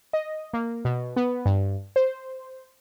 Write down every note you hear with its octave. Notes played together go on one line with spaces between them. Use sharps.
D#5
A#3
B2
B3
G2
C5